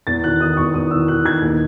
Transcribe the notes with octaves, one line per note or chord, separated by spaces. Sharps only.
E2 A6
D#3 F#6
D#3 D#6
E2 C#6
E2 D#6
D#3 E6
D#3 F#6
D#3 G#6
D#2